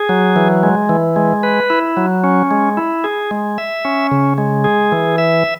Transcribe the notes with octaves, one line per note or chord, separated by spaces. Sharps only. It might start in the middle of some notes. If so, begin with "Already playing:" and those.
Already playing: G#4
F#3
E3
G#3
E3
G#3
B4
E4
F#3
C#4
G#3
E4
G#4
G#3
E5
C#4
C#3
G#3
G#4
E3
E5